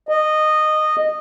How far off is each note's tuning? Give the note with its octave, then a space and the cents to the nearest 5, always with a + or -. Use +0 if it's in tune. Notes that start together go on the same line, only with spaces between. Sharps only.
D#5 -15